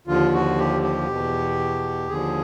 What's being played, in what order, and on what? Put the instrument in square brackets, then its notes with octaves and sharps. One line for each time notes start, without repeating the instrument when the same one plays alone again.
[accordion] D#2 D3 F3 F4
F#4
G4
G4
E2 B2
D#2 D3 F3 G#4